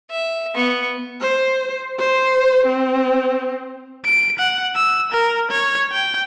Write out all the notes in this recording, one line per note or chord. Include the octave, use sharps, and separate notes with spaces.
E5
B3 C#6
C5
C5
C4
D7
F#5
E6
A#4
C#5
G5